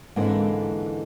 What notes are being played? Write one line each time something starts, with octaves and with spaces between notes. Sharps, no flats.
G#2 D3 E3 A#3 C4 E4